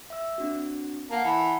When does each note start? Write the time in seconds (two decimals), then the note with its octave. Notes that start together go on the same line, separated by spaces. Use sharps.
0.10 E5 E6
0.38 C4 D4 F#4
1.11 A#3 F#5 A5
1.24 E3 F#5 A5 C#7